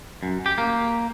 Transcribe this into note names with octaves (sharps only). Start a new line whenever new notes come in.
F#2
G4
A#3